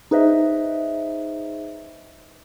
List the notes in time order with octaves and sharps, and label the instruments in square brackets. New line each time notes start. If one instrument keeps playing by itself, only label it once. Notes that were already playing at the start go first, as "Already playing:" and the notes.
[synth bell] D#4 G#4 B4 C5 D#5 E5